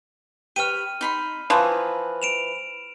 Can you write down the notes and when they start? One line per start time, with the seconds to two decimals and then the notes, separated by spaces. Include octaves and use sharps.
0.56 G4 B4 C#5 F6 D#7
1.01 D#4 B5 C6
1.50 E3 F3 B4 C#5 A#5
2.22 D7 E7 F7